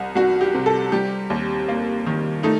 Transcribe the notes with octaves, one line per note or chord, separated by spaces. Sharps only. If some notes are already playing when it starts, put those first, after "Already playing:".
Already playing: C2
C2 F#4
G4
C3
A4
G3 G4
D#2
A#3
D#3
A3 D#4